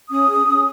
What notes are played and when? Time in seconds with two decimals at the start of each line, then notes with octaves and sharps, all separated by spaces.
0.09 C#4 D#6
0.28 G#4
0.45 C#4